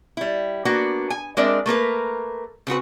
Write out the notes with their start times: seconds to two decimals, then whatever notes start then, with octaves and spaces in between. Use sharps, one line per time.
0.17 G3 E4
0.65 A#3 B3 D4 F#4
1.10 G#5
1.37 G#3 C4 D4 A#4 D5 E5
1.66 A3 A#3 A#4 B4
2.67 C#3 C4 F#4 B4